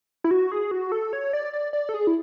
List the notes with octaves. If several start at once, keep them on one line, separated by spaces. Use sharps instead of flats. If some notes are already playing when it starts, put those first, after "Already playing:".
E4
F#4
G#4
F#4
A4
C#5
D5
D5
D5
A4
G#4
E4